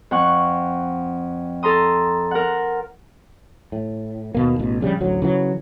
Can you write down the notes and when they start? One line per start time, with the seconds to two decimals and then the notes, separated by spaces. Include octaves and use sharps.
0.11 F2 F#5 C#6
1.63 A4 A#5 C6 D#6
2.31 A#4 F#5
3.72 A2
4.35 D#2 B2 A#3
4.59 A1 B2
4.81 A#1 C#3 G3
5.00 A1 D2 F#3
5.22 C#3 E3 F#3